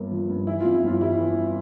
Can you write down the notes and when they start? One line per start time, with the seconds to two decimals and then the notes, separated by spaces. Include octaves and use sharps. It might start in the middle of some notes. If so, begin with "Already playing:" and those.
Already playing: G1 G2 A#3
0.11 F3
0.30 G2
0.47 E3 E4
0.60 F2 F4
0.74 E4
0.83 G1 F4
1.01 G3 E4
1.18 E3